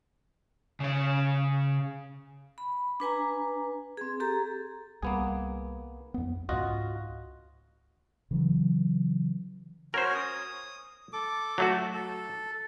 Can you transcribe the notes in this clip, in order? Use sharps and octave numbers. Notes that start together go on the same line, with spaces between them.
C#3 C#5
B5
D4 B4 G#5 A#5
C4 G#4
G4 A4 A#5
C2 G3 A#3 B3 G#4
F2 B3
C#2 G#2 F4 F#4 D#5
C#3 E3 F#3
C#4 F#4 A#4 C5 G#5
D#6
A4 D6
F#3 A3 F#4
A4